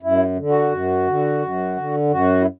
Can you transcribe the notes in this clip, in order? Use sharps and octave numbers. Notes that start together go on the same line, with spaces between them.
F#2 E4
D3
F#4
F#2
D3
F#2
D3
F#2 F#4
E4